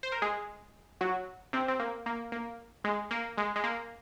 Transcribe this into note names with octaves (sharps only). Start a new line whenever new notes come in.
C5
A#4
G#3 G#4
F#3 F#4
C3 C4
C4
A#3
A#3
A#3
G#3
A#3
G#3
G#3
A#3